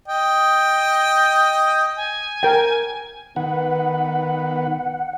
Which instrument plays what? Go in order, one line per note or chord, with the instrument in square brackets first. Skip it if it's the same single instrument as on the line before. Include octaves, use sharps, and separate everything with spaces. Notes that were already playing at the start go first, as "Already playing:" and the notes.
[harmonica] D#5 G5
[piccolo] G#5
[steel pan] A#4 G5
[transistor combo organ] D#3 B4 [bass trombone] B3 [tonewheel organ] F#5